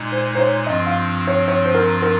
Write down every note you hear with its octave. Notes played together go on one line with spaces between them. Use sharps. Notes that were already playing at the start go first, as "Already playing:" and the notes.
Already playing: A#2 G#3 D#4
C5
C5
C#5
G2 F3 C4 F4 D#5
F5
C#5
C#5
C5
A#4
A#4